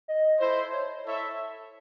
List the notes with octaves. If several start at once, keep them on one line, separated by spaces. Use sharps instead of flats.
D#5
E4 A4 C5
C#5
E4 A4 C#5 E5